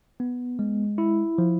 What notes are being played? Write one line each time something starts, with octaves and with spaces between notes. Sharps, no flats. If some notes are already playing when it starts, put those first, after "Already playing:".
B3
G#3
E4
F3